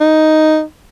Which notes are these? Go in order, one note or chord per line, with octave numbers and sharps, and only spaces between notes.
D#4